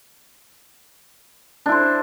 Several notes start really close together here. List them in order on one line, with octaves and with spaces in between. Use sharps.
D4 E4 C5